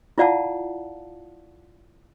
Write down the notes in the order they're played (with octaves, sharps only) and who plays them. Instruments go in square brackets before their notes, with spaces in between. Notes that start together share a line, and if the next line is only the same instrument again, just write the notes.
[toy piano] E4 F4 D5 F5 F#5 A5